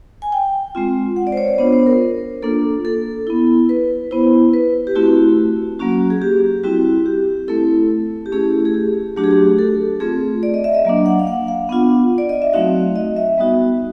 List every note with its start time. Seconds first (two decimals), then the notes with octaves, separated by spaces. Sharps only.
0.22 G#5
0.32 G5
0.75 G#3 C4 F4
1.16 F#5
1.27 D5
1.32 C5
1.37 C#5
1.48 C#5
1.58 B3 D4 F4 C5
1.72 C5
1.86 A#4
2.43 A#3 D4 F4 A4
2.85 A4
3.27 B3 E4
3.69 B4
4.11 B3 E4 C5
4.53 B4
4.87 G4
4.95 A3 C4 E4 F#4
5.79 F#3 A#3 C#4 F#4
6.10 G#4
6.22 G4
6.63 G3 C4 E4 F#4
7.06 G4
7.48 A3 C4 E4 A4
8.26 G4
8.32 A3 C#4 E4 G#4
8.65 G#4
8.74 G4
9.16 F#3 A3 D4 F#4 G4
9.24 G#4
9.31 G4
9.59 A4
10.00 A3 C4 F4 G#4
10.43 D5
10.54 D#5
10.64 E5
10.74 D#5
10.85 F#3 A#3 D4
11.06 F#5
11.19 F5
11.27 F#5
11.48 F5
11.69 B3 D4 F4 F#5
12.18 D5
12.29 D#5
12.42 E5
12.53 F#3 A3 C4 D#4 F#4 F5
12.96 D#5
13.17 E5
13.38 G3 B3 D#4 F#4